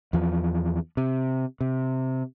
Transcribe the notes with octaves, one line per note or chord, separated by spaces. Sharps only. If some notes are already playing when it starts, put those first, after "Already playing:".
E2 F3
C3
C3